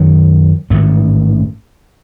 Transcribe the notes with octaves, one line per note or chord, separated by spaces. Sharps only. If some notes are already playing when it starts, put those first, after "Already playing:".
Already playing: F#2 D#3 F#3
A1 G#2 D#3 A3